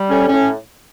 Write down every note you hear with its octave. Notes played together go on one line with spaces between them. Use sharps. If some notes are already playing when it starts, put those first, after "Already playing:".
Already playing: G3
A2 C#4
C#4
A2